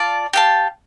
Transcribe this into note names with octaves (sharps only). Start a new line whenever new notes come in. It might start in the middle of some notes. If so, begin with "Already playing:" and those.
Already playing: F4 D5 A5
G4 F5 A5